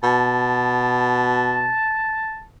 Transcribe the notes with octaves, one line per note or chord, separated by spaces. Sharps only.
B2 A5